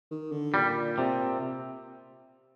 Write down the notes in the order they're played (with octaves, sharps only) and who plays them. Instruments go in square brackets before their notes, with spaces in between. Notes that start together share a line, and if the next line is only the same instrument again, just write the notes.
[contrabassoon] D#3
D3
[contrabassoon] A#2 [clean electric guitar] G3
[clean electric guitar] C3